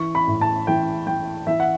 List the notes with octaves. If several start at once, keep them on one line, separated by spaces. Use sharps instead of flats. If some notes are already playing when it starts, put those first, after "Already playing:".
Already playing: E3 C#6
B5
A2
A5
E3 G5
E3 G5
E3 E5
F#5